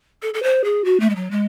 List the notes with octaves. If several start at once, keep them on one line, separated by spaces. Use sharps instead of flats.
A4
A4
C5
G#4
F#4
A3
G#3
F#3
G#3